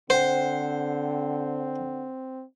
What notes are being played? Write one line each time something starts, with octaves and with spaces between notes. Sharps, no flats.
D3 C4 C5 F#5 G5